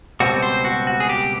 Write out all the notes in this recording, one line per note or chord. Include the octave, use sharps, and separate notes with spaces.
C#2 B2 G3 C4 F#4
C5
F#4
F#4
G#4
G4